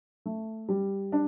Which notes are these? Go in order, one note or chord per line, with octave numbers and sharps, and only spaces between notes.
A3
G3
D4